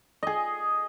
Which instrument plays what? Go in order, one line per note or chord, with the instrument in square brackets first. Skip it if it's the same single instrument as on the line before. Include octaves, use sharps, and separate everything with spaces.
[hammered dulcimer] G#4 D#5